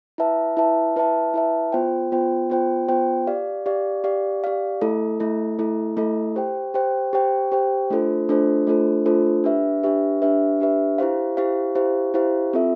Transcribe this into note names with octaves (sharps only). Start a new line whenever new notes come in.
E4 B4 E5 A5
E4 B4 E5 A5
E4 B4 E5 A5
E4 B4 E5 A5
B3 F4 C5 G5
B3 F4 C5 G5
B3 F4 C5 G5
B3 F4 C5 G5
G4 D5 F5
G4 D5 F5
G4 D5 F5
G4 D5 F5
A3 E4 A4
A3 E4 A4
A3 E4 A4
A3 E4 A4
G4 C5 G5
G4 C5 G5
G4 C5 G5
G4 C5 G5
A3 D4 F4 A4 C5
A3 D4 F4 A4 C5
A3 D4 F4 A4 C5
A3 D4 F4 A4 C5
D4 G4 B4 E5
D4 G4 B4 E5
D4 G4 B4 E5
D4 G4 B4 E5
E4 G4 C5 F5
E4 G4 C5 F5
E4 G4 C5 F5
E4 G4 C5 F5
C4 F4 A4 E5